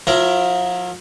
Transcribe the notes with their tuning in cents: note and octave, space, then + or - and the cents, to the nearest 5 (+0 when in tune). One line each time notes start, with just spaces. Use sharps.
F3 +45 E4 +25 A#4 +0